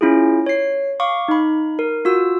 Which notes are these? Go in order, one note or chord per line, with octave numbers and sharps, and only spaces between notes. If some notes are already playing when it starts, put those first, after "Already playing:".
C#4 E4 F4 G#4
C#5 C7
F5 C#6 D6
D#4 B5
A#4
F4 F#4 E6